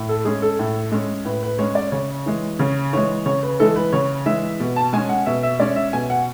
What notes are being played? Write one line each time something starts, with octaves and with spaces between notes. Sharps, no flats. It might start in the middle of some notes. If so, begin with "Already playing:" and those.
Already playing: A2
A4
G#3 C#4 G#4
A4
A2
G#3 C#4
A2 B4
B4
G#3 C#4 C#5
D5
C#3 C#5
E3 G#3
C#3 C#5
E3 G#3 C#5
C#3 C#5
B4
E3 G#3 A4
B4
C#3 C#5
E3 G#3 E5
B2
A5
G#3 C#4 G#5
F#5
B2 E5
E5
G#3 C#4 D5
E5
B2 G#5
F#5